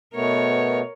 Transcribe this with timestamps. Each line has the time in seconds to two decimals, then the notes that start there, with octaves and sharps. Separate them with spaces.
0.14 B2 A3 B3 A#4 C#5